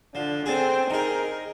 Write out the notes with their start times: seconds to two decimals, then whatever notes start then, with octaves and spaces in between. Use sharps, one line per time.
0.15 D3 F3
0.46 C4 G#4 A4
0.90 D#4 G#4 A#4